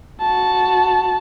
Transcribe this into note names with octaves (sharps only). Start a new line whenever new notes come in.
F#4 A5